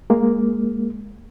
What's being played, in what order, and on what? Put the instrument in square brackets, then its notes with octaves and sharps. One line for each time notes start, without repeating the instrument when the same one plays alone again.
[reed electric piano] G#3 A#3